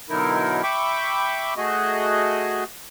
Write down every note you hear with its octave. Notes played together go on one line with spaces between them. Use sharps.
B2 D3 F#3 D#4 E4 A#4
E5 G5 B5 C#6 D6
A3 F#4 G#4 D#5